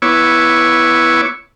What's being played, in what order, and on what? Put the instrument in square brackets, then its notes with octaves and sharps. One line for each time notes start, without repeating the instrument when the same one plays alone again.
[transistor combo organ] B3 E4 C#5 C#6 D6 E6